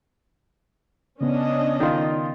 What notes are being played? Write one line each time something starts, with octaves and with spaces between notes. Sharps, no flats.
C#3 B3 C#4 D4 D#5
D#3 F4